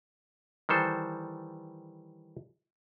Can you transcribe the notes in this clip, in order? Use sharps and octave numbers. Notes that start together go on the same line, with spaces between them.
D#3 E3 G3 A4 C5